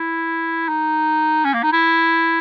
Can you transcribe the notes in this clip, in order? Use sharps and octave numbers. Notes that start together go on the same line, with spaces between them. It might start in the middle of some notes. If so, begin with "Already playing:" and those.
Already playing: E4
D#4
C#4
A#3
D#4
E4